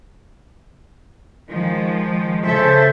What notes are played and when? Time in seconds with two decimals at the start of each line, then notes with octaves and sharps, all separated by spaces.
1.49 D#3 F3 G#3
2.44 C#3 A4 C5 E5